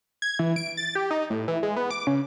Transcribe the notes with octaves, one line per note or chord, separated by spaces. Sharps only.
G#6
E3
D7
A6
G4
D#4
A2
E3
G#3
B3
D6
C#3